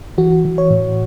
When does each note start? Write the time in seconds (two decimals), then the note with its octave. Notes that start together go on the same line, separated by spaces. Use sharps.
0.18 E3 F#4
0.45 E3
0.58 C#5
0.71 A2